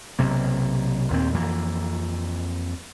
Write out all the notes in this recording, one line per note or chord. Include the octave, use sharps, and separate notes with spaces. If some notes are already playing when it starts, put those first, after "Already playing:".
B1 C3 A#3
D#2 A#2 C4
F2 E3 A#3